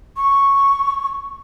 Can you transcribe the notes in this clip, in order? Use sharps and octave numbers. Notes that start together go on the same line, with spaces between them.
C#6